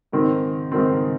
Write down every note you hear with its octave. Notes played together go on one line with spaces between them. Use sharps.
G#2 D#3 C4
G#2 D#3 C4